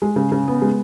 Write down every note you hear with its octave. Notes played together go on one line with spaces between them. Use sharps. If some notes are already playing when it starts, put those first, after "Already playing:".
G#3
C#3
C#3
B3
G#3